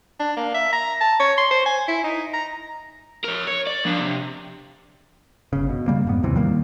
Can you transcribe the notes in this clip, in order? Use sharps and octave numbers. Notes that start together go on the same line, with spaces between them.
D4
A#3
E5
A#5
A5
C#5
C6
C5
G#5
E4
D#4
A#5
A#4 C#5
C#5
D5
F3 D4
C3
G1 C#3
B2
C#3 G3 A#3
F2 G#2 B3
A1 D#2 C3 E3
D#3 G3 A#3